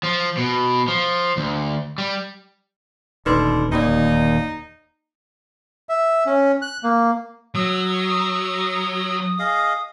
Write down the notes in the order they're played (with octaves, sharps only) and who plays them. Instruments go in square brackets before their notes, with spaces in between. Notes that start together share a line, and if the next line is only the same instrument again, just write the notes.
[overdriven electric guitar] F3
B2
F3
D2
G3
[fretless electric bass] D#1 D2 [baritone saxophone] D3 [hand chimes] D#4 B4 C6
[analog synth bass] D#2 [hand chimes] A#3 D5 [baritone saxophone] D#4
[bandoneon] E5
C#4
F#6
A#3
[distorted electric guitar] F#3 [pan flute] D#6 [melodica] E6
[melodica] G#4 D#5 F5